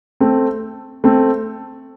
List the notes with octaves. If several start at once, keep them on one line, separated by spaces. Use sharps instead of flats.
A3 C4
A3 C4